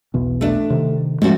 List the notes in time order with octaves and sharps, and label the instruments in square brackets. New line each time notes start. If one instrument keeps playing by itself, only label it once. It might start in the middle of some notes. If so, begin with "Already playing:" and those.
[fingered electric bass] B1 E2 B2
[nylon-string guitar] A3 D4
[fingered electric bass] C3 D#3
[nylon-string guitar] A2 F3 F#4 [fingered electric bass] G#3 C#4